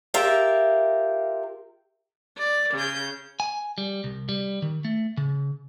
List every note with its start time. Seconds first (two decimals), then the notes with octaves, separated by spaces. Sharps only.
0.14 F4 G4 A#4 E5
2.38 D5
2.74 C#3 G6
3.40 G#5
3.78 G3
4.04 C2
4.29 G3
4.62 D#3
4.85 A3
5.17 C#3